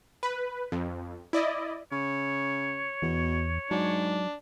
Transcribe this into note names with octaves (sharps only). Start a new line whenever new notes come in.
B4
F2
E4 D5 D#5
C#3 C#5
E2 B2
G#2 F#3 D4